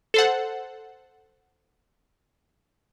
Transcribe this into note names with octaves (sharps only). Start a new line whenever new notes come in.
A4 C5 F#5